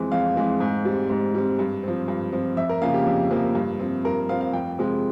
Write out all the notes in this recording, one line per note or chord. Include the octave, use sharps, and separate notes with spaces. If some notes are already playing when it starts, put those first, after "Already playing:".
Already playing: F2 E3 G#3 C4
F2 F5
E3 G#3 C4
G#2
G3 C4
G#2
G3 C4
G2
F3 C4
G2
F3 C4
F2 E5
A#4
C#3 F3 A#3 F5
G4
F2
C#3 F3 A#3
G2
F3 C4
G2 A#4
F3 C4 F5
F5
F2 G5
C3 F3 G#3